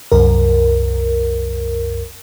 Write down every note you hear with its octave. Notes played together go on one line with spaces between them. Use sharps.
C2 F#2 A#4